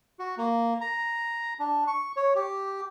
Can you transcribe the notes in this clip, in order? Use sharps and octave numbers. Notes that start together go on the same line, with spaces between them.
F#4
A#3
A#5
D4
C#6
C#5
G4